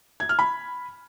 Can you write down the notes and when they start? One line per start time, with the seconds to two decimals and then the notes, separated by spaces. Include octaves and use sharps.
0.20 G#6
0.29 F6
0.39 B5